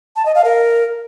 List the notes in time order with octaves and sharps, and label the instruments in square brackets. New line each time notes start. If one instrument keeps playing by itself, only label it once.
[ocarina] A5
D#5
F5
A#4